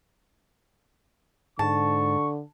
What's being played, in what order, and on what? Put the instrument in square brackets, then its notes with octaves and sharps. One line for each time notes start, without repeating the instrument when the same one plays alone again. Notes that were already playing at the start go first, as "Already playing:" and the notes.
[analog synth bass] G#2 [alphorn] D3 [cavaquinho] A5 [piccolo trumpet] C#6